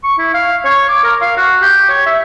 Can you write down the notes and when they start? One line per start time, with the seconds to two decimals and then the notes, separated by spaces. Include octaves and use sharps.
0.04 C#6
0.18 E4
0.34 F5
0.65 C#5
0.89 D6
1.04 A#4
1.22 F5
1.37 F#4
1.62 G4
1.89 C#5
2.06 E5